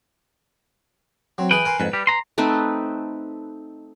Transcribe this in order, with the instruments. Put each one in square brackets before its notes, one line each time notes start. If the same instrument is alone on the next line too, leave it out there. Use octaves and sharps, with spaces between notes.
[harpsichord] F#3 C4
[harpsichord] E3 G#4 [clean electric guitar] B4 G5
[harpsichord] A#4 G#5 C6
[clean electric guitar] F2 G#2 [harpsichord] B4
[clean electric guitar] G3 G4
A#5 C6
[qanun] A3 C4 D#4 B4